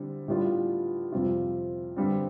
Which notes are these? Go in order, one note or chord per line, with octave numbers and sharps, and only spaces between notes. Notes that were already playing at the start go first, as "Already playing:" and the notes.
Already playing: D3 G3 C4 E4
A2 G3 B3 D4 F4
F2 C3 G3 C4 F4
G2 D3 G3 C4